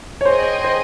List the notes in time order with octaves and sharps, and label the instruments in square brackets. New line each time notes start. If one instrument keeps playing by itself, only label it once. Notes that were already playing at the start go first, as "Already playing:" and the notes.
[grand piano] C#5
[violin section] G#4 D#5 G5 [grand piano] C5
[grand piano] C5